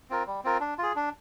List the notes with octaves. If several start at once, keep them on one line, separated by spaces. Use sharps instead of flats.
C4 F4 A#4
G3
C4 F4 A#4
D4
F4 G#4
D4